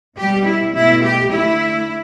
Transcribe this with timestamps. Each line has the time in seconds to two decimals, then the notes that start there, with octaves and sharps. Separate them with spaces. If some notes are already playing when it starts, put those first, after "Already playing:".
0.17 B2 G3 G4
0.45 E4
0.75 B2 A3 E4
1.03 G4
1.31 D3 A3 E4